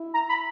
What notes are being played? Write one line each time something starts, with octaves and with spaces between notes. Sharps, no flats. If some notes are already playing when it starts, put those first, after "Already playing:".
Already playing: E4
A#5
B5